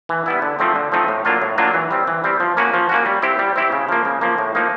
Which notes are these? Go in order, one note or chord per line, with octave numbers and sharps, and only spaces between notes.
E3
G3 B3 E4
D3
F3 A3 C4 D#4
D3
F3 A3 C4 D#4
A2
F#3 A#3 D4 F4
A2
F#3 A#3 D4 F4
E3
G3 C4
E3
G3 C4
F3
A#3 C#4 F#4
F3
A#3 C#4 F#4
G3
C4 E4 G4
G3
C4 E4 G4
C#3
F3 A#3
C#3
F3 A#3
A2
F3 A#3 D#4